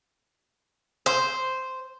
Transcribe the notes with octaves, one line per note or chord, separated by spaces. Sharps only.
C5